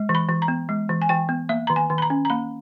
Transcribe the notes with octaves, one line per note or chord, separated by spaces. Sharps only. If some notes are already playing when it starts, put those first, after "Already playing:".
Already playing: G#3
E3
B5
E3
A#5
B3
G#3
E3
G#5
E3 G5
B3
A#3 E5
D#3 A#5
G#5
D#3
B5
A#5
C#4
A#5
A#3 B5